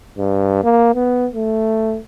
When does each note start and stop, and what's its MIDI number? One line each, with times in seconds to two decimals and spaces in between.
0.18 0.62 43
0.64 0.94 58
0.95 1.28 59
1.34 1.98 57